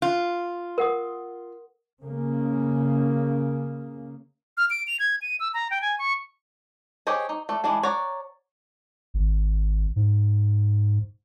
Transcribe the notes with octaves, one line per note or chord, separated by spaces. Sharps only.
F4
A#4 F#5 D#6
C#3 A#3
F6
D7
F7
G#6
D#7
E6
A#5
G5
G#5
C#6
G4 G#4 C5 C#5 D#5
D#4
A3 D5
E3 G#3 D4 G#4
C#5 D5 F#5 A#5
G#1
G#2